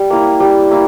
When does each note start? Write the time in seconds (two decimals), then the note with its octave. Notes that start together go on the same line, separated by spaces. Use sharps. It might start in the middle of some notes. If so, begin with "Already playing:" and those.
Already playing: G3
0.10 A#3 E4
0.40 G3
0.71 A#3 E4